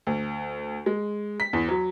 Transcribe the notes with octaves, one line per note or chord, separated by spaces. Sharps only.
D2
G#3
B6
E2
F#3